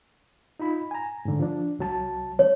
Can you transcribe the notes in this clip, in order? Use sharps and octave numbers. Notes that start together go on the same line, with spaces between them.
D#4 F4 B5
G#5 A#5
G#2 D3
F3 D4
C2 F#3 A5
C#5